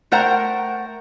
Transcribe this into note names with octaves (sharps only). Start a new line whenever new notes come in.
A3 A#4 C5 F#5 G5 A#5